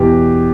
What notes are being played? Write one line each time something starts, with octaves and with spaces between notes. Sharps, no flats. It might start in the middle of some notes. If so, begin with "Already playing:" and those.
Already playing: E2 B2 G4